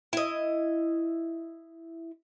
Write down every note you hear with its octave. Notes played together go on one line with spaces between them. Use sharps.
E4 D#5